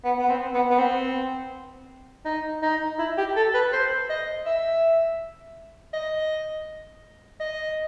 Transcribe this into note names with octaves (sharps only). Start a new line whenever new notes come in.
B3
B3
C4
B3
B3
C4
D#4
D#4
E4
G4
A4
B4
C5
D#5
E5
D#5
D#5